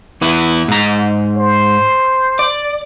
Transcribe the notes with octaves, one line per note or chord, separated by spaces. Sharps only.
E2 B3 E4
G#2 A#5
C5
D5